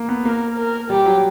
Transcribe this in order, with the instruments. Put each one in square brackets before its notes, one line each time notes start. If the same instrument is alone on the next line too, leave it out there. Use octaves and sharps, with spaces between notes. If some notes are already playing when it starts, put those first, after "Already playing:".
Already playing: [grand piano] A#3
B3
[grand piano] A#3 [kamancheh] A#4
[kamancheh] A#4
[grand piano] G3 [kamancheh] G4
[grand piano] F#3